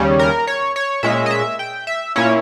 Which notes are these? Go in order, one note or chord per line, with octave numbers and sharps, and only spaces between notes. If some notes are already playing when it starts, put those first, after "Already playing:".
Already playing: D#2 C#3 G3 C#4
A#4
C#5
C#5
A#2 G#3 C#4 E5
D#5
E5
G5
E5
A#2 A#3 C#4 E4 C#5